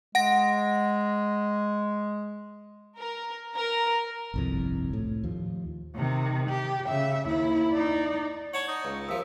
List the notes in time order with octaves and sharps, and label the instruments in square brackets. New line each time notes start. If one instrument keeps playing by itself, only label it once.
[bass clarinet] G#3 [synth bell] F#5 A#6
[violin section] A#4
A#4
[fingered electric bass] G1 C2 F2
A2
D#2 F3
[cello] C3 D#3
G4
C#3 E5
D#2 E4
D#4 D5
[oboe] C#5 [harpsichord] F#5 A5 C#6
[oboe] D#4
[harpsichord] C#2
[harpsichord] D#2 F3 [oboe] E5